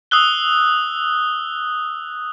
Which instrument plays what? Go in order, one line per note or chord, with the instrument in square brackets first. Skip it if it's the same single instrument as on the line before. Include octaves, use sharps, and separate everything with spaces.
[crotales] D#6 E6 F#6 G7